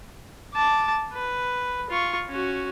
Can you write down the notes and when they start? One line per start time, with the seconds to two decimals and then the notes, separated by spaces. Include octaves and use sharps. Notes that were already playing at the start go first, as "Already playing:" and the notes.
0.54 A5 D6
1.13 B4
1.90 F4 C#6
2.29 C#4 F#4